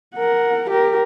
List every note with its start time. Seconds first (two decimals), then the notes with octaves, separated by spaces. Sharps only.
0.15 A#4 F#5
0.70 G4 A#4